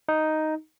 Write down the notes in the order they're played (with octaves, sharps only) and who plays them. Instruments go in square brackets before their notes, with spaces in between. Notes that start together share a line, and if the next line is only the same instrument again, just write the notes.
[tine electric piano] D#4